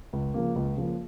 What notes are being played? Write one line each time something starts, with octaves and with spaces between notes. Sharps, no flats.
C#2
C#3 F3 A#3
C#2
C#3 F3 A#3